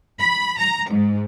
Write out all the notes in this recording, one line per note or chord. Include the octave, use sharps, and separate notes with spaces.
B5
A#5
G#2